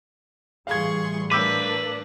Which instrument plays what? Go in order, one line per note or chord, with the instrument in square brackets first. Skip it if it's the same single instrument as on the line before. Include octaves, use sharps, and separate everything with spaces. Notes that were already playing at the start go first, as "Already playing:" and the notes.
[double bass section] A2 E3 G3 [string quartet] G#4 C6 C#6 [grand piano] F5 G#6
[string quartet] A3 A#3 D4 [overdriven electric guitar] B4 [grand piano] D6 E6 G6